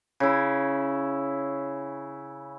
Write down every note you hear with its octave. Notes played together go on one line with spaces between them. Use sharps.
C#3 E4